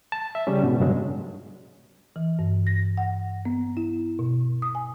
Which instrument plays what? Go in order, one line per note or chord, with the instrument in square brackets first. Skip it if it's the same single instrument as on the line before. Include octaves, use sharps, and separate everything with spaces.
[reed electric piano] A5
E5
C#3 G3 C#4
G#2 B2
G2 C#3 F#3 G#3
[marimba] E3
G2
A#6
F#5
B3
E4
B2
D#6
G#5